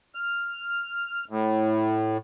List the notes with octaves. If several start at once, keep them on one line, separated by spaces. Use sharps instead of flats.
F6
A2